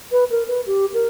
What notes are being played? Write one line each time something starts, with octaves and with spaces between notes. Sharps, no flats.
B4
A#4
B4
G4
A#4